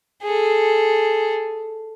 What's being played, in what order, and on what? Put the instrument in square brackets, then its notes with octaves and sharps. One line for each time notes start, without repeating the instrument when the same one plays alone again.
[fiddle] G#4 A4